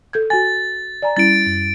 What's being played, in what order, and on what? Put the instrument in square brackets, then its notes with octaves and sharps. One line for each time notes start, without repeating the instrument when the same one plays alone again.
[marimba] A4 G6 G#6
[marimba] F#4 G#5 [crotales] A6
[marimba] D5 G#5 A#5
[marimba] G3 C#4 E4 [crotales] A6 D7
[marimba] F#2